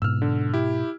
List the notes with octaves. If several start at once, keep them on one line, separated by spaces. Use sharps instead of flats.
G#2 B2 E6 F6
D3
E4 G4